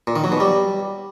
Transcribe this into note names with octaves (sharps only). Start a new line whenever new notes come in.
A#2
D#3
F#3
B2
G3